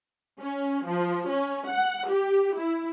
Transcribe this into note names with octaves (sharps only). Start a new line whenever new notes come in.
C#4
F3
C#4
F#5
G4
E4